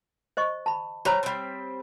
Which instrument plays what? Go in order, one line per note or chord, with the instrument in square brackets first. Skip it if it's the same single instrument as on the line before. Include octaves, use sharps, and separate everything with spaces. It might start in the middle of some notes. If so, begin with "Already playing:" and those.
[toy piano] C5 D#5 C#6
A5 B5
[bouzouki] G3 A#5 [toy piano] G4 C5 C#5
[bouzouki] G3 C4